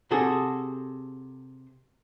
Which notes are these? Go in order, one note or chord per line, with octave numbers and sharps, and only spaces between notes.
C3 F#4 G#4 A4